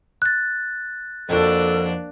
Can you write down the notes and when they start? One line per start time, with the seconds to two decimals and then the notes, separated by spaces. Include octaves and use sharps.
0.22 F#6 A6
1.29 F2 A#3 D4 F#4 A4